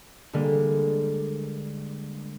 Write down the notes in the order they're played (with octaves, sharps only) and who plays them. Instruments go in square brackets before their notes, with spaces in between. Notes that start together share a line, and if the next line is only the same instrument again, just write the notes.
[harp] D3 G3 G#3 A#3